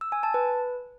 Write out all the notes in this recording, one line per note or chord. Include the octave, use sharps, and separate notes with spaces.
E6
G#5
A5
B4